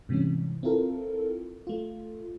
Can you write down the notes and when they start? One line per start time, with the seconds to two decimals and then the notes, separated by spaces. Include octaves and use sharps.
0.09 G#2 C3 E3 G3 C#4
0.63 C4 E4 F4 A4 A#4
1.67 A3 F4